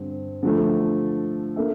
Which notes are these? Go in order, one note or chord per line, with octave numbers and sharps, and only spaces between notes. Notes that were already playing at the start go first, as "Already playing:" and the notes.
Already playing: G2 D3 C4
D3 F3 A3
A#3 D4 A4 E5